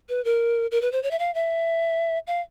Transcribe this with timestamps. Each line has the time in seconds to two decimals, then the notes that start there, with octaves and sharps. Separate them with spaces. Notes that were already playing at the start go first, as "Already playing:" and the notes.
0.09 B4
0.25 A#4
0.71 A#4
0.82 B4
0.92 C5
1.03 C#5
1.11 E5
1.19 F5
1.35 E5
2.27 F5